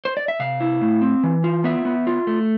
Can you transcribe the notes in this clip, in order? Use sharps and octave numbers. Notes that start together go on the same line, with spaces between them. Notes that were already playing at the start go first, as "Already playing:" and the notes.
C5
D5
E5
C3 F5
E4
A2
C4
E3
F4
B3 E5
B3
F4
A3